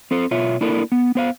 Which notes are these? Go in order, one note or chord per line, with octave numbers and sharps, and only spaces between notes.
C4 A4 C5
B2 F4 C#5 E5
A#3 D4 E4 A4 A#4
B3
B3 C5 F5